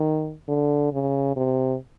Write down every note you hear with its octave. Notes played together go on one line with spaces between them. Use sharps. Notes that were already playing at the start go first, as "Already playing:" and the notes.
Already playing: D#3
D3
C#3
C3